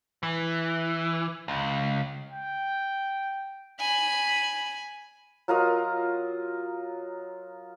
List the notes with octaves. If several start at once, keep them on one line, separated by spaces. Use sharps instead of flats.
E3
C#2
G5
G#5 B5
F#3 F4 A#4 D#5